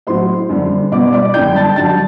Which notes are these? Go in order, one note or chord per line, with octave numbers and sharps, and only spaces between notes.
A2 F#3 C5 C6
F#2 D3 G3
B2 G3 D5 D6
D5 D6
F#2 D3 G3 G5 G6
A5 A6
G2 D3 F#3 A5 A6